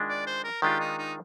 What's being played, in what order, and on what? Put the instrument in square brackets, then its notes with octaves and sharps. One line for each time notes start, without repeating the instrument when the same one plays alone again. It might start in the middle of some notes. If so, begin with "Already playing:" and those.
Already playing: [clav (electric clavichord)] D#3 G#3 D4 F4
[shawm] D5
C5
A#4
[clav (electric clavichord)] D#3 G#3 D4 F4 [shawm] G4
[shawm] D#4
D#4